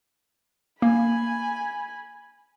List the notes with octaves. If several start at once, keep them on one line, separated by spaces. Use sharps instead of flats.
A#3 G#5 B5